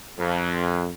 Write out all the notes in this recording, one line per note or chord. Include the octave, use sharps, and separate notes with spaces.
F2